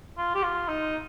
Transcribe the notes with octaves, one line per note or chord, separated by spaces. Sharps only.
F4
G4
F4
D#4